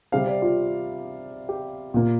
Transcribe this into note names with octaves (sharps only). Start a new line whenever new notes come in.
C3 G3 C4 F5
D5
F4
G4
A#2 A#3